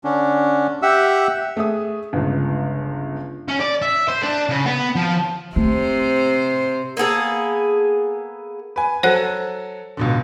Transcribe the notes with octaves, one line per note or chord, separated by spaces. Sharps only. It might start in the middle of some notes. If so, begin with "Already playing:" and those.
D3 C#4 D4
G4 E5 F#5 E6
A3 G#4 E5 D#6
G1 C#2
C#4
D5
E5
C5
D4
C#3
B3
F3
C3 A3 C5
A#3 B3 G#4 A4
B4 G#5
F#3 A4 C5 F#5 A5 F#6
C#2 B2 D3